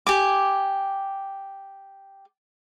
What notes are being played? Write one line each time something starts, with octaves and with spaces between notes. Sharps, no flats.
G4 G#5 D6